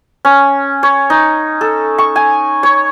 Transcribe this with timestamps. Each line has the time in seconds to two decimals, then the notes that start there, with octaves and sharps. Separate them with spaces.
0.25 C#4
0.83 C#5
1.10 D#4
1.61 A4
1.98 C#6
2.16 G#5
2.63 C#5